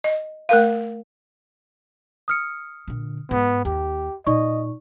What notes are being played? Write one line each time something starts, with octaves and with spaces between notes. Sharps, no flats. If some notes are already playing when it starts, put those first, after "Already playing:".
D#5
A3 A#4 F5
D#6 F6 C#7
A#2 D3
G#2 B3
D#2 G4
A#2 D#4 D5 D#5 C#6